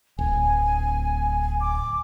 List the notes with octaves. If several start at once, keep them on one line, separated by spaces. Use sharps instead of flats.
D1 G#5
D6